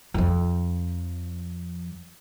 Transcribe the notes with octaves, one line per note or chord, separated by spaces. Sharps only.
F2 F3